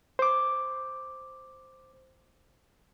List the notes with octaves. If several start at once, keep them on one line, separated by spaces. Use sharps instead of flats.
C5 D6